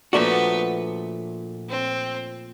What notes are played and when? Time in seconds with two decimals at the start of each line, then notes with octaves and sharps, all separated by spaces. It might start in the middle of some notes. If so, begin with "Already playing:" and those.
0.13 A#2 F3 A3 B3 D4 F#4
1.69 C4